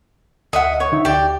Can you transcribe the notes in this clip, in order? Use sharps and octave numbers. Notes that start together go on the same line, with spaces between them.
D2 D#5 E5 F#5
C#5
D3 D#4 E5
D2 G4 D5